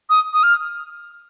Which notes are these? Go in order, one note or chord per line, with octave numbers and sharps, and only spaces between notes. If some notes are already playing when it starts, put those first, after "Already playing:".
D#6
D#6
F6